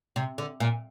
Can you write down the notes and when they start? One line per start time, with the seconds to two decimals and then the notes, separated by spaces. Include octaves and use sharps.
0.16 C3
0.38 D3
0.60 A#2